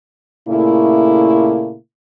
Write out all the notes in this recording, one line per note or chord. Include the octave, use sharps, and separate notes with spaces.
A#2 C#3 A3 A#3 E4